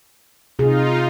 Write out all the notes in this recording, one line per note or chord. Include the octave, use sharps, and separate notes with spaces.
C3 D#4 F4 G#4